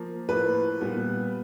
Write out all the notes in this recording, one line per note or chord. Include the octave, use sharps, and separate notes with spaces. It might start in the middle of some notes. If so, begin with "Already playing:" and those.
Already playing: F3 A#3
A2 F3 A#3 B4
A#2 G3 B3